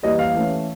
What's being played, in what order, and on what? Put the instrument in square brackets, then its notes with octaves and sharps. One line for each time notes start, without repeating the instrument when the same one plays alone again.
[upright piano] E3 G3 A#3 D#5
F5
E3 A3 C#4